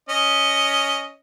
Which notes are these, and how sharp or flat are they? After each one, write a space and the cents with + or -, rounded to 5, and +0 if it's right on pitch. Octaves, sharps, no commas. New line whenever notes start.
C#4 +10 D#5 +0